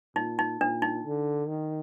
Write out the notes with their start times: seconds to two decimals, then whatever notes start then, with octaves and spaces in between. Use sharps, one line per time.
0.16 A#2 D#4
0.39 D#4
0.61 A#2 D4
0.82 D#4
1.05 D3
1.48 D#3